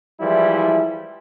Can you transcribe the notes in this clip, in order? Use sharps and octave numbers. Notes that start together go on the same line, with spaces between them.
E3 F3 G3 G#3 E4